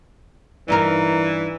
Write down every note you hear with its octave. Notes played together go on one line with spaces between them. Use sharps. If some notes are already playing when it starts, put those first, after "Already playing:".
G2 E3 D#4 A#4